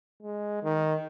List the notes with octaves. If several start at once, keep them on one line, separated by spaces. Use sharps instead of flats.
G#3
D#3